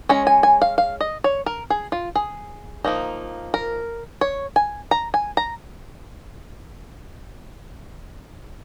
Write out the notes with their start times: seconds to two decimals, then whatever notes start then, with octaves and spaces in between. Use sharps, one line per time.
0.09 G#3 C#4 C#5
0.27 G#5
0.43 G#5
0.62 F5
0.78 F5
1.01 D#5
1.24 C#5
1.46 A#4
1.70 G#4
1.92 F4
2.15 G#4
2.84 F3 A#3 D#4
3.54 A#4
4.21 C#5
4.56 G#5
4.91 A#5
5.14 G#5
5.37 A#5